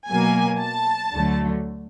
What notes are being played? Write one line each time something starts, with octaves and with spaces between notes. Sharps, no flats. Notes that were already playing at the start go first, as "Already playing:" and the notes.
B2 F#3 A#3 G#5
A5
D2 D3 F#3 A3